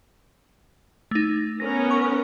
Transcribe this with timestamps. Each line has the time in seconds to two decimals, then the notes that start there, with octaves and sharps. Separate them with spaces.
1.11 A3 D#4
1.60 B3 C#4 A#4 A#6
1.91 C#6